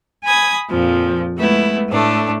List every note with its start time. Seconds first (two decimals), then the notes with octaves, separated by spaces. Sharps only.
0.25 G#5 B5 D#6 G#6
0.68 F2 A#2 F3
1.37 G#3 A3 B3 E4
1.89 A2 A3 D4